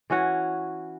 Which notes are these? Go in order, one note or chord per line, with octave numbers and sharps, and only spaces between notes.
E3 C#4 F#4 C#5